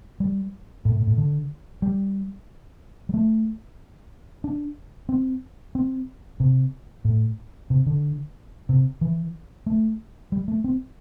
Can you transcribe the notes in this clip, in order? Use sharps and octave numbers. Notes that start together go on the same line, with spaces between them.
G3
A2
A2
A2
D3
G3
G3
A3
D4
C4
C4
C3
A2
C3
D3
C3
E3
A3
G3
A3
C4